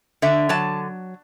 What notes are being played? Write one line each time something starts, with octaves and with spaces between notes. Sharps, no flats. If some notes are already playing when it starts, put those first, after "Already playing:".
D3 E5
F#3 A5